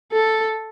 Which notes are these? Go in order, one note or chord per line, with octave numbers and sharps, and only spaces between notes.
A4